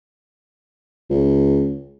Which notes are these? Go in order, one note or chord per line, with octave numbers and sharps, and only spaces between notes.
C#2